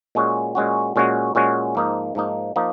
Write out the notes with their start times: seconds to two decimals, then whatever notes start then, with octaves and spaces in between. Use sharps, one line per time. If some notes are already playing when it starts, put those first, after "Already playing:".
0.15 A#2 G#3 C#4 F#4
0.55 A#2 G#3 C#4 F#4
0.96 A#2 G#3 C#4 F#4
1.35 A#2 G#3 C#4 F#4
1.75 G#2 F3 A#3 D#4
2.15 G#2 F3 A#3 D#4
2.56 F3 A#3 D#4